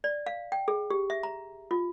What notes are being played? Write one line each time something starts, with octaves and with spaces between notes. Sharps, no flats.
D5
F5
G5
G#4
G4
E5
A#5
F4